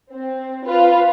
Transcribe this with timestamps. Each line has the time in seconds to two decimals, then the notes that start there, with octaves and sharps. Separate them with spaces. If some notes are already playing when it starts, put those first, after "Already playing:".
0.11 C4
0.65 F4 B4